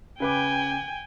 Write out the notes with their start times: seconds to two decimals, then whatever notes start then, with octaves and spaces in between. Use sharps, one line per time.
0.20 C#3 B4 G5 G#5 D6